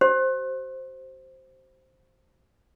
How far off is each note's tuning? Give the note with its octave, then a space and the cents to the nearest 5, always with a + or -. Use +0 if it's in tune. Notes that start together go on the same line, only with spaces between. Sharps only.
F#4 +45 C5 +0